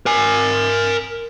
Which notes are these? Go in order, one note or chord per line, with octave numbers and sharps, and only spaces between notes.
A#4 G#5